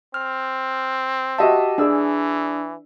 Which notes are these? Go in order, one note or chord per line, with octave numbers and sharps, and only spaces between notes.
C4 F6
F#4 G4 D#5 E5 A5
E3 D4 G#4 D5 E6